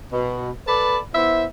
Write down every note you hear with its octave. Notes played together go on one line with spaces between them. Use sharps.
B2
A4 B4 D5 A5 B5
B3 E4 C5 E5